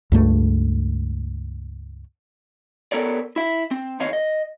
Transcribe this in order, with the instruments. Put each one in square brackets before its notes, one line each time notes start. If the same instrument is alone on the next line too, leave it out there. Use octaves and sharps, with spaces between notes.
[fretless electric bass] C#2 G2 A3
[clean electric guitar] B3 A4 A#4 C#5 D5
E4 E5
C4
E2 D#3 C#5 D#5 F5
D#5